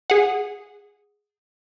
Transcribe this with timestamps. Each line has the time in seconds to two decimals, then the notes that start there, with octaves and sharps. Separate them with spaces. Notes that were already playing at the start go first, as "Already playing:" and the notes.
0.10 G#4 F#5